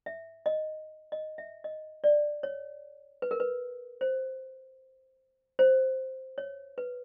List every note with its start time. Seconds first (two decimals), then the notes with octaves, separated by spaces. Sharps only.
0.06 E5
0.46 D#5
1.12 D#5
1.38 E5
1.64 D#5
2.04 D5
2.43 C#5
3.22 B4
3.31 A#4
3.40 B4
4.01 C5
5.59 C5
6.38 C#5
6.78 B4